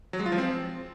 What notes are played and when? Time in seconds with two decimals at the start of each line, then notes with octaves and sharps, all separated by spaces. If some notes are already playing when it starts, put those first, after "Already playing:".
0.13 F#3
0.20 G#3
0.26 F4
0.32 F3
0.38 C4